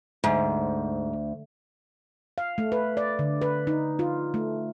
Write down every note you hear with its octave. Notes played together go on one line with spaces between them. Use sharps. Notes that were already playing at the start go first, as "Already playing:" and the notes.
D2 G#2
F5
A3
B4
D5
D3
B4
D#4
F4
A3